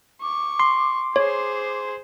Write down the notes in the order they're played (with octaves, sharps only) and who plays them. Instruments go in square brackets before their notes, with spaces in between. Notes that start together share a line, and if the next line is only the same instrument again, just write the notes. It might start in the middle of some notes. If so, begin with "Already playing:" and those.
[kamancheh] C#6 [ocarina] D6
[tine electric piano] C6
[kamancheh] G#4 C5 [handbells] C#5